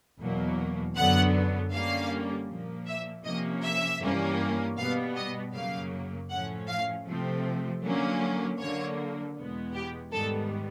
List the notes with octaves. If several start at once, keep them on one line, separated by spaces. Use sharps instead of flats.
E2 B2 F#3 A#3
F#2 D3 F#3 B3 F#5
D3 G3 A#3 C#4 F5
A#2 F3 A#3
E5
C3 F3 A#3 C#4 D#5
E5
G2 E3 G3 A#3 C#4
B2 G3 B3 F5
D#5
F#2 C#3 F#3 A#3 F5
A2 F3 A3 C#4 F#5
F5
C3 F3 A3 C4
D3 F#3 A#3 C#4
D3 F#3 A#3 C#5
E2 B2 G#3 B3
G4
G#2 D#3 G3 B3 A4